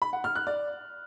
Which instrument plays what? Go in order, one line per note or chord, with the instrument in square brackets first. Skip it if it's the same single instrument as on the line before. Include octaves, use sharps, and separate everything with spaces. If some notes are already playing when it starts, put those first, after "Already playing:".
[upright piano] B5
F#5
F6
F#6
D5